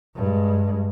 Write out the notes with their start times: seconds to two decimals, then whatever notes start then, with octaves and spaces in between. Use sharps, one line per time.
0.16 G2 G#3